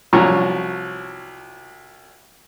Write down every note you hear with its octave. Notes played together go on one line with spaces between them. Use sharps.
C2 F3 F#3 C#4 A#5 C#6